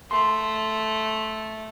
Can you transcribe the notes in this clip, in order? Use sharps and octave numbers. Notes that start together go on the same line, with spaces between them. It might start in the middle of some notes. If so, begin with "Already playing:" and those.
A3 C6